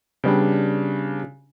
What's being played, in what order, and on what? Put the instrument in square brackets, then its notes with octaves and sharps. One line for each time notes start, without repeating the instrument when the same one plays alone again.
[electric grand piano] C#3 D4 [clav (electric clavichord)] G3 B3 G5